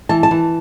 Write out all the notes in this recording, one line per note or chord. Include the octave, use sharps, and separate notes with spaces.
E3 A5
A5
E3